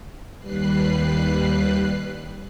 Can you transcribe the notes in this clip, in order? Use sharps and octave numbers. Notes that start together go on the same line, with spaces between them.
D#2 G3 B4 F#6 C7